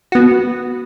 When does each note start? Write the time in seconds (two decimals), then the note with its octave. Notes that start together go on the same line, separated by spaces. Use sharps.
0.12 B3 F#4